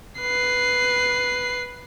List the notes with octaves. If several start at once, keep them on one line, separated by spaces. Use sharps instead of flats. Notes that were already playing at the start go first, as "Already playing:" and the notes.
B4 C7